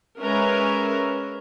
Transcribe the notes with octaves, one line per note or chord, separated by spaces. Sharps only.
G#3 C#4 A#4 B4 E5